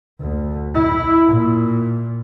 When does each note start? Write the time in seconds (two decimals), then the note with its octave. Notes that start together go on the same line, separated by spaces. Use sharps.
0.20 D2
0.74 E4
1.27 A#2